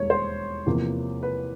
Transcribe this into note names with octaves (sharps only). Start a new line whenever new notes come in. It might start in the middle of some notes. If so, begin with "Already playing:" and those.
Already playing: E1 D#2 G3 C#5
C5
E2 C3 F3 A#3
B4